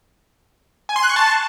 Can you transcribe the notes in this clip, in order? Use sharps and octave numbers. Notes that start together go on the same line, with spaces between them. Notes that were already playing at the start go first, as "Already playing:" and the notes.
G#5
C6
F#6
C#6
A5